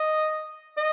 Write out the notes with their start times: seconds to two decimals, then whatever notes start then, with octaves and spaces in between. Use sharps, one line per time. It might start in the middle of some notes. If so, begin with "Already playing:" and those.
Already playing: D#5
0.77 D#5